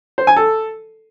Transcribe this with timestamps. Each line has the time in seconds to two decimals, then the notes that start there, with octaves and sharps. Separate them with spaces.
0.18 C5
0.27 G#5
0.36 A4